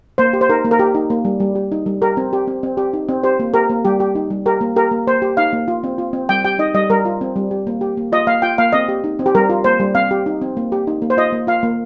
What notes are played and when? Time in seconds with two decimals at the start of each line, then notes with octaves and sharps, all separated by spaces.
0.18 A#3 C5
0.33 G4
0.41 C5
0.49 D#4 A#4
0.65 A#3
0.71 A#4
0.79 G4
0.95 D#4
1.10 A#3
1.25 G3
1.40 G3
1.55 G4
1.72 D#4
1.86 G3
2.02 G4 A#4
2.17 C4
2.33 G4
2.47 C4
2.63 C4
2.77 G4
2.93 D#4
3.09 C4
3.23 G4 C5
3.40 A#3
3.54 G4 A#4
3.70 A#3
3.85 G3 G4
4.00 G4
4.15 D#4
4.30 G3
4.46 G4 A#4
4.61 A#3
4.76 G4 A#4
4.91 A#3
5.07 A#3 C5
5.22 G4
5.37 D#4 F5
5.53 A#3
5.68 F4
5.84 C4
5.98 F4
6.13 C4
6.29 G3 G5
6.45 G4 G5
6.59 D#4 D#5
6.74 G3 D#5
6.89 G3 A#4
7.05 F4
7.21 C4
7.36 G3
7.51 G4
7.67 A#3
7.81 G4
7.97 A#3
8.12 F4 D#5
8.27 A#3 F5
8.42 F4 G5
8.58 A#3 F5
8.73 C4 D#5
8.88 G4
9.04 D#4
9.19 C4
9.26 G4
9.35 G3 A#4
9.50 F4
9.64 A#3 C5
9.80 G3
9.95 C4 F5
10.11 G4
10.26 D#4
10.41 C4
10.57 A#3
10.72 G4
10.87 D#4
11.02 A#3
11.10 C5
11.17 F4 D#5
11.33 A#3
11.47 F4 F5
11.63 A#3